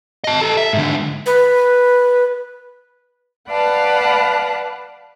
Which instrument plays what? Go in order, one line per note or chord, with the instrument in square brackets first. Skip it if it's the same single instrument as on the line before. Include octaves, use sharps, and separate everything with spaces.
[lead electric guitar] D#5 A5
G4 A4
E5
G#2 D3
[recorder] B4
[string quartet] B4 D5 F5 F#5 A5 B5